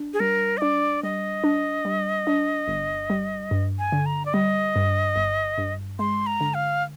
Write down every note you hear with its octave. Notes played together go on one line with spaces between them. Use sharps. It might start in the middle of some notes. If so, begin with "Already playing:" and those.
Already playing: D4
G#4
G3 A#4
D#5
D4 D5
G3 D#5
D4
G3
D4
G1
G3
G2
G#5
D3
A#5
D5
G3 D#5
G2
G1
G2
G#3 C6
A#5
D3
F5